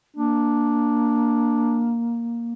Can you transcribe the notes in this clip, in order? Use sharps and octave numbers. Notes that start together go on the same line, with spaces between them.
A#3 D4